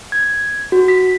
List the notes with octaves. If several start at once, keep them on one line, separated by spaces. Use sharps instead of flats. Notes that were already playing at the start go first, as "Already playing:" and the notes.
G#6
F#4
B6